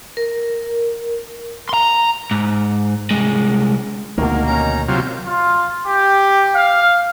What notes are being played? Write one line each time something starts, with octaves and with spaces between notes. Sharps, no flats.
A#4
A#5 C6
G#2
C2 G#3
D2 B2 D#3 A#3 A#4
C#4 D#4 A#5
C3 F#3 F4
F4
G4
F5